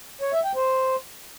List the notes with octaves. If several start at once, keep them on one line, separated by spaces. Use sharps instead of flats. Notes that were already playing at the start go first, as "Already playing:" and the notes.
C#5
E5
G5
C5